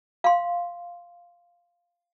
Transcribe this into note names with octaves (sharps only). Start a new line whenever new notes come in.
F5 C6